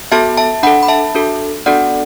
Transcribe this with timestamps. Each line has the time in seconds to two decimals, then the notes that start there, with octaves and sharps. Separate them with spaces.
0.12 B3 F#4 A4 E5 A5
0.38 E5 A5
0.63 D4 A4 F#5 B5
0.83 B5
0.88 E5 A5
1.15 D4 F#4 A4
1.66 B3 D4 F#4 A4 D5 F#5